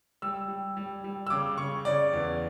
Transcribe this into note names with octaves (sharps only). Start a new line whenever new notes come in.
G3 E6
G3
G3
G3
E6
C#3 D6
C#3 C#6
C#3 D5
E2